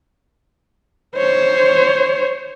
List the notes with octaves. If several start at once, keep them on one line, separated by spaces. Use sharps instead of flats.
C5 C#5